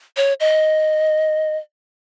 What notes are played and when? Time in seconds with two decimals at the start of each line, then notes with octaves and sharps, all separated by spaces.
0.17 C#5
0.40 D#5